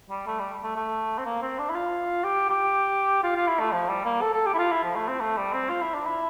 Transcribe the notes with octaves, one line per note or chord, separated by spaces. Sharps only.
G3
A3
G3
A3
A3
C4
A#3
C4
D4
E4
F4
G4
G4
F4
F4
E4
A3
F3
G3
A#3
A4
A4
G4
E4
F4
E4
F3
A3
C4
A3
G3
C4
F4
E4
D4
E4